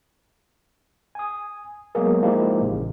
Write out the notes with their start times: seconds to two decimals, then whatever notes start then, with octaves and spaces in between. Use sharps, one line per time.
1.15 G#5 D#6
1.95 F#3 G#3 A#3 B3 G#4 A#4
2.22 F3 G#3 A#3 D#4 E4 G4
2.61 A1 C#3